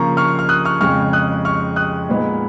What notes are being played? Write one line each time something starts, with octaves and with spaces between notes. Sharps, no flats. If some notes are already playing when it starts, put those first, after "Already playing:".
Already playing: C#3 F3 A#3 A#5 C#6
C#6 F6
F6
D#6 F#6
C#6 F6
F2 C#3 G#3 C#6 F6
D#6 F#6
C#6 F6
D#6 F#6
A#2 G#3 B3 D#4